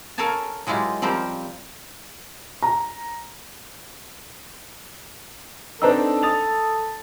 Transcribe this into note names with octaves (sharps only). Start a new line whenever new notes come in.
A4 A#4 C#5 F5 G#5 A5
F#3 G#3 E4 F4 G4
F3 G3 C4 A#4 C5
A#5
C4 D4 D#4 A4 B4 A#5 E6
D#6 A6 F7